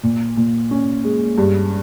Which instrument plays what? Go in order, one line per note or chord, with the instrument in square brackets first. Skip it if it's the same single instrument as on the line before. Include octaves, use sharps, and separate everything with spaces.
[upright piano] A#2
A#2
C#4
G#3
G2